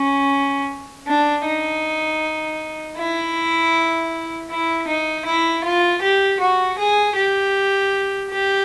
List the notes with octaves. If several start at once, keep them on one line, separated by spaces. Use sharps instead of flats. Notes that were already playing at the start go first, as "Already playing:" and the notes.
Already playing: C#4
D4
D#4
E4
E4
D#4
E4
F4
G4
F#4
G#4
G4
G4